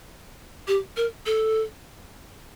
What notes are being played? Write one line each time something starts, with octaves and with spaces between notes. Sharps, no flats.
G4
A#4
A4